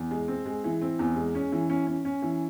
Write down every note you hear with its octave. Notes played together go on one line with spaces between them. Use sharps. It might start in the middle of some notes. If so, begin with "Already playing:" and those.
Already playing: E2
G#3
C4
G#3
E3
C4
E2
G#3
C#4
E3
C#4
C#4
C#4
E3